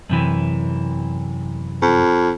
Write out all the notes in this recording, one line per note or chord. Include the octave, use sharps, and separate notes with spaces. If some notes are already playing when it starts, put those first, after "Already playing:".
F#2 C3 E3
F2